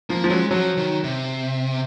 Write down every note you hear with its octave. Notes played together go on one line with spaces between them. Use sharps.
F3 A#3
F3
F#3 G#3
F3 F#3
D#3
C3